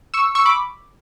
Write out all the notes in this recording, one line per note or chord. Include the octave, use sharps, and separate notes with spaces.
C#6 E6
C#6 E6
B5 D6